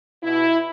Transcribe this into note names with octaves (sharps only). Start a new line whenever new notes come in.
B2 E4